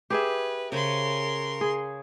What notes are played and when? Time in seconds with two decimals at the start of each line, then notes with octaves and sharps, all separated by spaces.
0.10 G4 G#4 B4 E5
0.72 C#3 A#4 C5 B5 C6
1.61 G#4